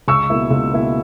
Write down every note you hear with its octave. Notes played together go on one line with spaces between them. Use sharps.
C#2 C#6 E6
B2 A#3 E4
C#2
B2 A#3 E4